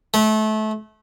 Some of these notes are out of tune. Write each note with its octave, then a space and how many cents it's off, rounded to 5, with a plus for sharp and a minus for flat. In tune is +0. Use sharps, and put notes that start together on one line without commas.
A3 -25